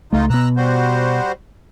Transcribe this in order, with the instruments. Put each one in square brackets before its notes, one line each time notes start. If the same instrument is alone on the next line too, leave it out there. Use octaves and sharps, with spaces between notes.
[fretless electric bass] C#2 A3 [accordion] D#4 F4
[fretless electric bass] B2 B3 [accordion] A#5 E6 F#6
[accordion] G3 F#4 C5